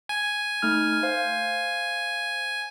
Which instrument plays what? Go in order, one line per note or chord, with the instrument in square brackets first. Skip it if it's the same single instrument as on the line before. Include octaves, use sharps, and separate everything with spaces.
[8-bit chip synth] G#5
[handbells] A3 D#4 F6
C5 F5